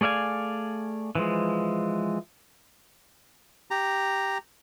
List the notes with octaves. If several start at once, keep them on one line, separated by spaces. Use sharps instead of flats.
A3 G#4 D5 F5 G#5
E3 F3 G#3
G4 A#5